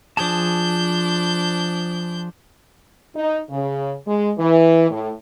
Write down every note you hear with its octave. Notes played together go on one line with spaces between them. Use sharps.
F3 D4 G#4 A5 G6
D#4
C#3
G#3
E3
A2